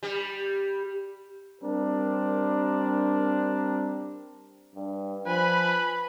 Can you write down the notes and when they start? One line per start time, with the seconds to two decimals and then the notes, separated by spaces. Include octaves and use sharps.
0.03 G3
1.62 G3 C4 D4 A#4
4.75 G2
5.27 F3 B4 G#5 B5